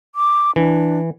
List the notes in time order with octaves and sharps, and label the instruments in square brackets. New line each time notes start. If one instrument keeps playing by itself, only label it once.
[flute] D6
[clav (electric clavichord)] E3 [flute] D4